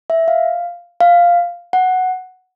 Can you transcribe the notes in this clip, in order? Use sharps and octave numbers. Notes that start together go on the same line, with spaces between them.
E5
F5
F5
F#5